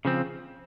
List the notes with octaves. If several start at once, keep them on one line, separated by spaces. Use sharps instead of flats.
C#3 F3 C4